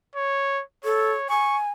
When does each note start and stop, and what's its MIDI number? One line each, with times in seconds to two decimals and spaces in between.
0.16 0.63 73
0.85 1.12 69
0.85 1.29 73
1.30 1.71 80
1.30 1.57 85